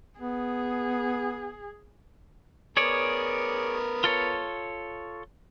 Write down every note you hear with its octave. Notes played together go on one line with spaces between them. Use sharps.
B3 G#4
B3 G#4 A#4 C#5 D5
F4 A4 C#5